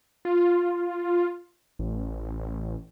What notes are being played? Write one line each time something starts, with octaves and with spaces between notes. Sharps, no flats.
F4
A1